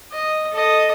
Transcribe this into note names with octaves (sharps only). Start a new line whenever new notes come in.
D#5
A4 D#5